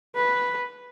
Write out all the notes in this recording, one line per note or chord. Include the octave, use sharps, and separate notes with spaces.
B4